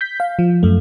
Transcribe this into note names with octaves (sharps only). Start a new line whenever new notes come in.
G6 B6
F5
F3
F#2 A3